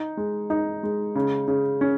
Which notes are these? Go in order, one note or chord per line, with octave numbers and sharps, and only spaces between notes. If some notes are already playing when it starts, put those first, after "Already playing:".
Already playing: D#4
G#3
D#4
G#3
C#3
C#3
C#4